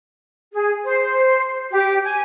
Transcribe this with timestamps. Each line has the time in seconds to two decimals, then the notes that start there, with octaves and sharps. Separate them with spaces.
0.52 G#4
0.84 C5
1.71 G4
2.03 G#5